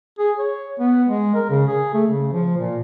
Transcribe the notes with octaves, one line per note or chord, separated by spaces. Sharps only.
G#4
C#5
B3
G#3
A#4
C#3
G#4
A3
C#3
F3
A#2